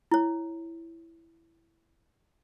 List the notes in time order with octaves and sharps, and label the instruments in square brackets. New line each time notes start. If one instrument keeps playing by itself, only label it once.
[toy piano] E4 C#5